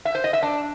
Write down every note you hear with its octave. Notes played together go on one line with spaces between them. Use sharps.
E5
C5
D#5
E5
D4